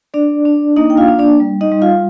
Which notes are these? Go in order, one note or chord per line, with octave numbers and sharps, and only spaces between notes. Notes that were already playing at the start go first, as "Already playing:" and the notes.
D4 D5
D4
A#3 D#4 D#5
G5
F4 F5
D4
D4 D5
G3
D#4 D#5
G3
F4 F5